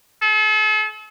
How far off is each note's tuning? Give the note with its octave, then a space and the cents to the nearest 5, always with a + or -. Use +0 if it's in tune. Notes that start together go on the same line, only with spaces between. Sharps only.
A4 -40